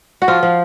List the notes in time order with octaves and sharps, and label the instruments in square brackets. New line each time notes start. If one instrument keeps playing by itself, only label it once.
[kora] F#4
F3 F4
F3